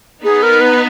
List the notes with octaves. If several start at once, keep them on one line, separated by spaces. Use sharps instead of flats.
B3 D#4 G#4
A#4
B4